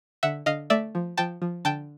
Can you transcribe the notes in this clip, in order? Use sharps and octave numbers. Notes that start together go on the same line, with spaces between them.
D3 E5 F#5
D3 D#5 F5
A3 D5 E5
F3
F3 G5 A5
F3
D3 G5 A5